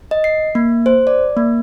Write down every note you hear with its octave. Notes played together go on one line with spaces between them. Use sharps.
D#5
C7
A#3
C5
D5
A#3